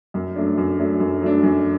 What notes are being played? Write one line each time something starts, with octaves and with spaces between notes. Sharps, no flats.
F#2
F#3 A3 D4
F#2
F#3 A3 D4
F#2
F#3 A3 D4
F#2